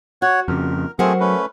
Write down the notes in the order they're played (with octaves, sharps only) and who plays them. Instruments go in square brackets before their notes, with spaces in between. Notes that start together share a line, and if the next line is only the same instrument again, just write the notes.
[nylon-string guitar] F#4 [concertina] C#5 F#5
[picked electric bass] F2 C#3 [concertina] A#4
[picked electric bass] F#3 [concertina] A3 C4 G#4 [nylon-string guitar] A#4 C5 F#5
[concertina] A3 C#4 B4